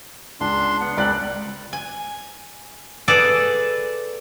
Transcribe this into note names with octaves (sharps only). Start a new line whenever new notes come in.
C#2 D4 C6
B3 F#5
C#2 C4 A#4 D5 B5 F#6
G#5
G#4 A4 B4 D5 F#5